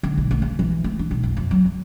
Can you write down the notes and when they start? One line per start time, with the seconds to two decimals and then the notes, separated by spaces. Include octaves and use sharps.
0.03 D3
0.18 B1
0.31 A3
0.42 C#3
0.59 E3
0.84 A3
0.99 D4
1.11 B1
1.23 F2
1.37 F2
1.51 F#3
1.65 F#3